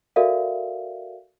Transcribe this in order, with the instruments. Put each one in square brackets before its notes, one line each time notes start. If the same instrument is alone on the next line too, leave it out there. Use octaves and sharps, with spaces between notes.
[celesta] F#4 A4 A#4 D5 E5 F5